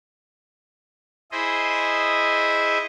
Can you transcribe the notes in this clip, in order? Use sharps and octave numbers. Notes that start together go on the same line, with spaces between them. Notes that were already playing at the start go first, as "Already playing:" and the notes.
E4 G#4 C5 D#5 E5